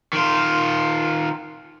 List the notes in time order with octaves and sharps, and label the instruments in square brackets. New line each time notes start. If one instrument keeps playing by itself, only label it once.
[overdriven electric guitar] D#3 F4